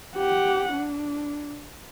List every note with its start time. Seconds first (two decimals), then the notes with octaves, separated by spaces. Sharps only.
0.17 G4 F#5
0.73 D4